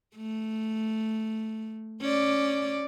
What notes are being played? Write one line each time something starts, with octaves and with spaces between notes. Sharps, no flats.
A3
C#4 D5